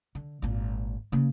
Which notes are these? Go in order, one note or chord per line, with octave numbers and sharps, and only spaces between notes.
D3
G#1 A#2
C#3 A#3